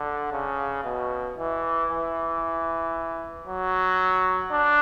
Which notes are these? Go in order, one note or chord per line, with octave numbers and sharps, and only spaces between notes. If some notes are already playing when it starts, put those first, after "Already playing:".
Already playing: D3
C#3
B2
E3
E3
F#3
D4